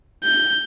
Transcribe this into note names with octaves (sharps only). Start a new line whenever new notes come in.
G6